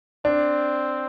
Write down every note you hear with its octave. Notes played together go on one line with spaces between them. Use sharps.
C4 D4